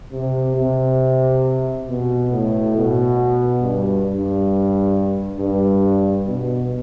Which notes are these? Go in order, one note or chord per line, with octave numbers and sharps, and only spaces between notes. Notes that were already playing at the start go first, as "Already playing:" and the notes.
C3
C3
B2
A2
B2
G2
G2
G2
B2